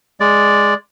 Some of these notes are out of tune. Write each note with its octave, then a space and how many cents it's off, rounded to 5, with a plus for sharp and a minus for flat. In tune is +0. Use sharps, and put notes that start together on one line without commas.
G#3 +0 D5 +0